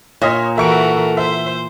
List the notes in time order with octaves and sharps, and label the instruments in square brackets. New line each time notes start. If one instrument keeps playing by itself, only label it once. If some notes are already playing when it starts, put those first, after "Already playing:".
[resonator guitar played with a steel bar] A#2 [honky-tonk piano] C#5 D#5 C6
[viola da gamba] E3 F#4 A#4 [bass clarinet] A4 [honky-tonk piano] E5 C#6 D7
[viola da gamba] C5 [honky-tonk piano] E5